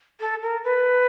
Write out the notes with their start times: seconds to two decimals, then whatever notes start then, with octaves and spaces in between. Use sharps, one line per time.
0.20 A4
0.42 A#4
0.64 B4